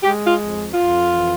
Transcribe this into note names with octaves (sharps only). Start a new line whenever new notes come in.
G#3 G4
F4
F2
F2 F4
E3